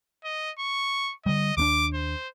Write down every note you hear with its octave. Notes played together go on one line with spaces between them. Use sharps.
D#5
C#6
D3 G3 D#5
D#2 C4 D4 D6
C5